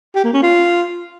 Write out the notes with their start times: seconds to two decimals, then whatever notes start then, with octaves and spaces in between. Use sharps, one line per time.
0.15 G4
0.24 A#3
0.33 C#4
0.42 F4